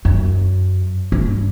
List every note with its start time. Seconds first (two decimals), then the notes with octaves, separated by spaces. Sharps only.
0.05 F#2
1.12 G2